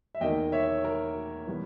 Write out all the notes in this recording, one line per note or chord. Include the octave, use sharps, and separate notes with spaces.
E5
E2 D#3 A#3 D#5 G5
C#5 E5
A#4
E3 G3 B3 E4